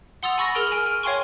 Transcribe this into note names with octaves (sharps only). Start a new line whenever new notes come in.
F#5 C6 D#6 E6 A6 F7
G#5 B5 C#6 E6 A#6
G#4 A#4 F6 D7 F#7
G#5 F6 D7 D#7
F6
C#5 F5 G5 G#5 C6 C#6